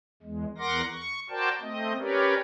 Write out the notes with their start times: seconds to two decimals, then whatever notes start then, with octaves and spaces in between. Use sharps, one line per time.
0.23 E2 G#3
0.58 E2 A#4 F#5 C6 D6 A#6
0.93 C#6
1.30 F#4 A#4 C5 D5 G5 A5
1.61 A3 C4 D#5
1.99 C#4 G4 A#4 B4 C#5 D5